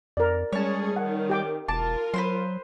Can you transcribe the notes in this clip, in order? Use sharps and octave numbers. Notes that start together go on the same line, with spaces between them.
F2 A#4 D5
G3 G#3 C#4 G#4 C#5 A5
D#3 F#5
G4 G5 D6
E1 F4 A#4 A5 D6
F#3 B4 C5 C6